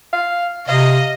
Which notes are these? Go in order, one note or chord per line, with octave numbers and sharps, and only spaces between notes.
F5
C3 D#5 F5